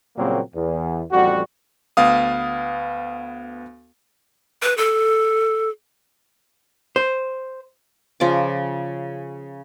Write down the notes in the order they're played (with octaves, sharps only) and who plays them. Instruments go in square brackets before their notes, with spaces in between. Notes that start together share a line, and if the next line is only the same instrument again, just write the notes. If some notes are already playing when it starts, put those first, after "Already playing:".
[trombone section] A#2 C#3 F#3 G3 A#3 C4
E2
A1 F2 G3 F#4
[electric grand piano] D2 B3 F5 D#6
[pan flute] B4
A4
[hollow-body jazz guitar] C5
[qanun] C#3 F3 D5 D6